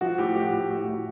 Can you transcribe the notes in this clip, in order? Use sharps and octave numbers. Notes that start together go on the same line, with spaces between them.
F3 F#4
A2 G4
F3 G4
F#4
A2 G4
A2 F#4
A2